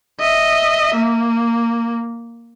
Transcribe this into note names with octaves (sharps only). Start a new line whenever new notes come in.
D#5 E5
A#3